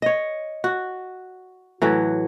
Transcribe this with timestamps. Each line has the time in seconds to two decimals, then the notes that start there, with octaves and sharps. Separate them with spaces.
0.02 C#5 D#5
0.64 F#4
1.82 A2 E3 F#3